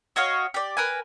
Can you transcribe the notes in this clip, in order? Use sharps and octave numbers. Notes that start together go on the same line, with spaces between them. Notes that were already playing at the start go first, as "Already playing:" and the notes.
F#4 C#5 D#5 F5
G4 D5
A#4 B4 G#5